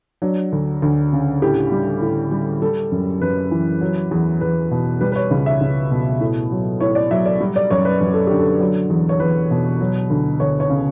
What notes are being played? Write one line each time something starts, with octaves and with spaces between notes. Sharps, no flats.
F#3 D4
D2
D2
C#3
A2 G4
G3
A2
G3
G3 A4
F#2
F#2 B4
E3
F#3
E2
E2 B4
B2
G3 B4
B4
C#5
C#2
E5
C#2
B2
A2
F#3
A2 C#5
D5
F#3 E5
D5
G3
D5
F#2 C#5
B4
F#2 B4
A4
D3 G4
A4
F#3
E2
C#5
E2 B4
B2
F#3
D2
D2 C#5
C#5
C#3